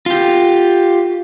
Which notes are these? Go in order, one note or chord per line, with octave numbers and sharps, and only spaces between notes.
F4 G4